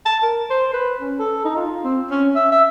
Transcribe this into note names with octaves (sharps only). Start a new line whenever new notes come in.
A5
A#4
C5
B4
C#4
A4
D#4
F4
C4
C#4
E5
E5